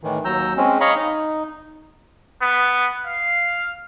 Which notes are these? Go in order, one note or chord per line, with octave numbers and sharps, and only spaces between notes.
A2 D#3 E3
D#2 F#3 A#5 E6 G6
G#3 C4 C#4
C#5 D#5 F5 A#5 B5 C#6
D#4
B3
F5